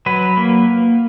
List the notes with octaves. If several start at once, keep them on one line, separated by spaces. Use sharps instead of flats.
F#3 B4
A#3